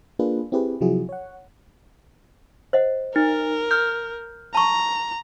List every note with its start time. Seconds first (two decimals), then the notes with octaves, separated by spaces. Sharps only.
0.19 A#3 D4 F4 G#4 B4
0.52 C4 E4 G4 G#4 B4
0.81 C3 F3 F#3 E4 F#4 G#4
1.09 C#5 F#5
2.73 C5 D#5 F#5
3.16 D#4 A#4
3.71 F6 G6
4.55 A5 A#5 C#6